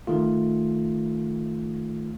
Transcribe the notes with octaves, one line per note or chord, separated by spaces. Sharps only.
D#3 A3 F4